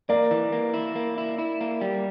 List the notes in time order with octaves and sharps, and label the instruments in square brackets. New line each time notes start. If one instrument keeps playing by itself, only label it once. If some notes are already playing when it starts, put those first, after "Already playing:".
[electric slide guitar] A#3 [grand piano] A#4 D5
[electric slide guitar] E3
A#3
E4
A#3
E4
E4
A#3
G3